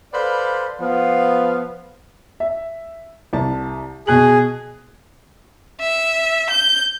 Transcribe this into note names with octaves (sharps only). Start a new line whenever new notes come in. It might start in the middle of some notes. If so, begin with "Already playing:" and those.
A4 B4 C5 D5 F5 B5
F3 B3 F5
E5
C2 A5
B2 G#4 F#6 F#7
E5
G6